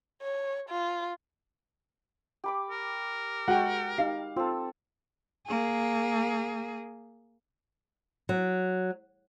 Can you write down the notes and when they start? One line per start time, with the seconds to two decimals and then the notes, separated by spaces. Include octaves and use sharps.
0.22 C#5
0.69 F4
2.44 G4 B5 D6
2.70 A#4
3.48 G#3 F#4 F#5 G5
3.98 D#4 G4 F5
4.36 C4 F4 A4
5.47 A#3 G#4
8.29 F#3